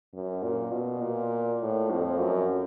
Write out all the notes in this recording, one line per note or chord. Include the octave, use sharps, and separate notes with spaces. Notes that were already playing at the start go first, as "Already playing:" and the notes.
F#2
A#2
B2
A#2
A2
F2
F#2